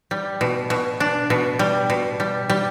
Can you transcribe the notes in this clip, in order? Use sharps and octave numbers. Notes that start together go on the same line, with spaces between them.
G3
B2
B2
D4
B2
G3
B2
G3
G3